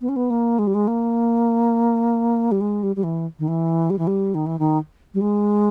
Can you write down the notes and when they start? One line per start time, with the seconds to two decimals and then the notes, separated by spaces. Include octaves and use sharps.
0.01 B3
0.09 C#4
0.16 B3
0.30 A#3
0.59 G#3
0.67 G3
0.74 G#3
0.87 A#3
2.52 G3
2.61 G#3
2.83 G3
2.96 G3
3.03 E3
3.39 D#3
3.48 E3
3.90 G3
3.99 E3
4.07 G3
4.35 D#3
4.46 E3
4.59 D#3
5.14 G3
5.21 G#3